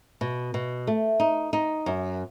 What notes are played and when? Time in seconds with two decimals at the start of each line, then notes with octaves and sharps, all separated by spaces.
0.21 B2
0.54 B2
0.87 A3
1.20 D#4
1.53 D#4
1.86 F#2